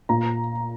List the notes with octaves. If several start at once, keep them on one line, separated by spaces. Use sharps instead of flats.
A#2 A#5